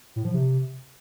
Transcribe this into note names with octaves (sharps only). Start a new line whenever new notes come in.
A2
F3
C3